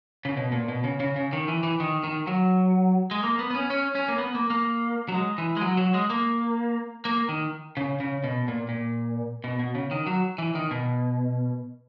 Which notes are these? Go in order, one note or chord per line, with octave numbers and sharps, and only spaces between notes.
C#3
B2
A#2
B2
C#3
C#3
C#3
D#3
E3
E3
D#3
D#3
F#3
G#3
A#3
B3
B3
C#4
C#4
C#4
A#3
B3
A#3
A#3
F#3
G#3
E3
G#3
F#3
F#3
G#3
A#3
A#3
D#3
C#3
C#3
B2
A#2
A#2
B2
B2
C#3
D#3
F#3
E3
D#3
B2